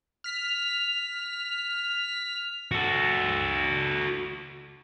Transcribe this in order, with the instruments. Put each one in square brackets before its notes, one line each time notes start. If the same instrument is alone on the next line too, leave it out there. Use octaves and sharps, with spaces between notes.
[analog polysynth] F6 B6
[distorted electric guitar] F#4 A4